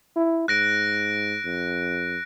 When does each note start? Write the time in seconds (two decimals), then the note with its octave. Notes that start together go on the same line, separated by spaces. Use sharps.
0.16 E4
0.48 G#2 F#6 A#6 D7
1.45 F2